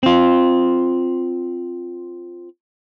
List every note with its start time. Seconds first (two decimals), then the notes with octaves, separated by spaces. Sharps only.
0.03 C4 F4